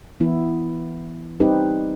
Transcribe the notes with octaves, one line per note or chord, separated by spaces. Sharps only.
E3 B3 E4
G3 C4 D#4 G4 B4